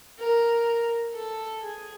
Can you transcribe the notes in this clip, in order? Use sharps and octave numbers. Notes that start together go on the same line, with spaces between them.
A#4
A4
G#4